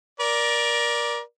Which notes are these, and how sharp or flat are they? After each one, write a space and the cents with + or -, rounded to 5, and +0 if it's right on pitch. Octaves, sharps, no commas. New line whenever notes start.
A#4 +25 D5 +0